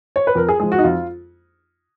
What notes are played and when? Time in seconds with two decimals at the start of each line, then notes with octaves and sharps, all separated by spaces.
0.16 C#5
0.27 B4
0.35 F2 A#4
0.49 G#4
0.60 F3 G#3 G#4
0.72 F#4
0.78 D#4
0.84 F2 F4